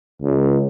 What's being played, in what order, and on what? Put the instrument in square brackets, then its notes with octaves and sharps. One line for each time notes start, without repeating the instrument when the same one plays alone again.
[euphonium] C#2